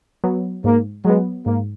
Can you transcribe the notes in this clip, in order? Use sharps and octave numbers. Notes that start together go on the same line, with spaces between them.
F#3 B3
G#2 A#3
F#3 G#3 B3
G#2 A#3